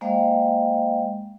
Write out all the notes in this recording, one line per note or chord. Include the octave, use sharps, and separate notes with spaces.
G#3 A#3 C5 D#5 F5 G5